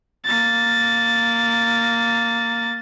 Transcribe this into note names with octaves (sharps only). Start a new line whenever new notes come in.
A#3 A6